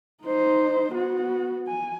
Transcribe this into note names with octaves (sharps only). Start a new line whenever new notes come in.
D#4 C5
B3 F#4
G#5